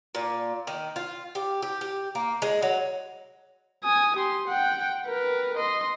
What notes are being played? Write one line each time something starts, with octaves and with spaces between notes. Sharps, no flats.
A#2
D#3
F4
G4
G4
G4
A#3
G#3
F#3
G#5 D#6
G4 C6
F#5 G5
A#4 B4
D#5 C6